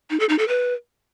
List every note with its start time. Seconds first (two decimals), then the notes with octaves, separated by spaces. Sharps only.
0.10 D#4
0.20 A4
0.29 D#4
0.39 A4
0.48 B4